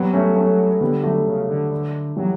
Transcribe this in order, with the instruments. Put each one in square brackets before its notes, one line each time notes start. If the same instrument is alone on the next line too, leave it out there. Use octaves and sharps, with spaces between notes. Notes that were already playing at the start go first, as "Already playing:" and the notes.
Already playing: [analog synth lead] F#3 [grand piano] G3 B3
[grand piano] A3 C#4
A3 C#4
[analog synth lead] D3 [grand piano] G3 B3
[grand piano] F#3 A3
[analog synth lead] C#3
D3
D3
[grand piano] E3 G3 [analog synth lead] F#3